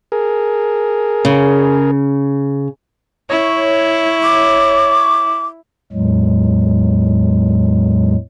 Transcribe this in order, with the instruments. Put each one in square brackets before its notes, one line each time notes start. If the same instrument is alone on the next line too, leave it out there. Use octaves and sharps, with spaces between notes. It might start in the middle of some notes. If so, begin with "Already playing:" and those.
[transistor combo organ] G#4 A#4
[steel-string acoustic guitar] C#3
[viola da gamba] E4 [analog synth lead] C#5
[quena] D6
[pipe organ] E2 A2 F#3 G#3